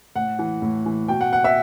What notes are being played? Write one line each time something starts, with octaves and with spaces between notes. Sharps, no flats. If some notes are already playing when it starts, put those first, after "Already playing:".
A2 F#5
E3
A2
E3
B2 G5
F#5
F#5
E5